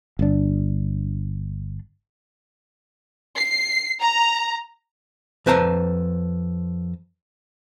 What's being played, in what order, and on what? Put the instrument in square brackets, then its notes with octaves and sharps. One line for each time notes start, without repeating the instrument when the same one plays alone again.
[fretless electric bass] G1 D4
[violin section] C7
A#5
[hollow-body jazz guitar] F2 B4 C5 A5 A#5